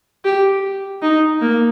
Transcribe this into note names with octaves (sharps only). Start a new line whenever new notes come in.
G4
D#4
A#3